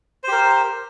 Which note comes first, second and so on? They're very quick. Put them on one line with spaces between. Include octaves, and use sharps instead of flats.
C5 G4 A#4